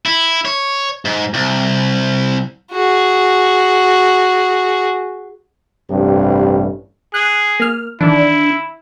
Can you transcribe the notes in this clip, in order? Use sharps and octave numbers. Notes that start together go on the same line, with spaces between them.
E4
C#5
G#2
C2
F#4 G#4
A1 G2 C3
G#4 F#6
A#3 F6
D#3 E3 D4 E4